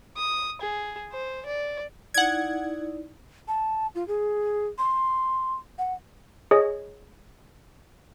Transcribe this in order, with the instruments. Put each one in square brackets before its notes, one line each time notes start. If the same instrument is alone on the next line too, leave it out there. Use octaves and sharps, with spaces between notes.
[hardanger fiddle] D#6
G#4
C5
D5
[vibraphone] D#4 E4 D5 [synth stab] F#5 G#6
[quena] A5
F4
G#4
C6
F#5
[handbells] G#4 C#5 D#5